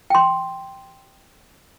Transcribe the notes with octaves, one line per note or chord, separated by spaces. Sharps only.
G5 C6